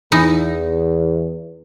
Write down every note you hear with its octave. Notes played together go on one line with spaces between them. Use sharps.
E2 E3 D#4